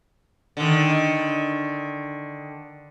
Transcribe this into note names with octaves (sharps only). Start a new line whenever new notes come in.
D3 D#3